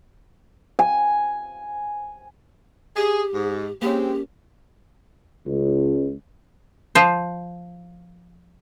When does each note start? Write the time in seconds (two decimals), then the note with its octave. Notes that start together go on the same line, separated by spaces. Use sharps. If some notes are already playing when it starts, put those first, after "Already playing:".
0.79 G#5
2.96 G4 G#4
3.34 G#2
3.82 G#3 A#3 C4 C#4 G4
5.46 C#2
6.95 F3 C5